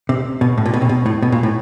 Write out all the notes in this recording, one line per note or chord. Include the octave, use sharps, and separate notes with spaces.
C3
B2
A2
A#2
B2
C3
B2
A2
B2
A#2
A2